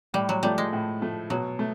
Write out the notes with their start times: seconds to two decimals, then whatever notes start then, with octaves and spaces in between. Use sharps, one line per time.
0.14 A2 G3
0.29 F#3
0.43 F3 G3 A3
0.58 G#3
0.73 A2
1.01 F3 A3
1.30 B2 F#3
1.59 A3